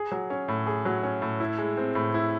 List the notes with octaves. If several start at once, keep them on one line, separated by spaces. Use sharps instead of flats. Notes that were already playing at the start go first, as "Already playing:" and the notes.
Already playing: G#4
F#3
C#4
A2
G#4
F#3
C#4
A2
E4
G#3
C4
A2
E4